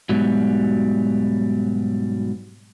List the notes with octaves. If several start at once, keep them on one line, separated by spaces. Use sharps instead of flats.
G#2 B2 F#3 G3